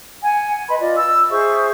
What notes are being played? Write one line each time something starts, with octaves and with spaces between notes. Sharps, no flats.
F#5 G#5
B4 D#5 B5 C6
F4 D5 D#5
E6
G#4 C5 E5 C#6